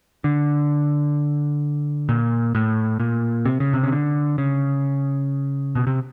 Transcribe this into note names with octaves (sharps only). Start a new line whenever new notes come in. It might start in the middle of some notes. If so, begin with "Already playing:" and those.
D3
A#2
A2
A#2
C3
C#3
C3
C#3
D3
C#3
B2
C3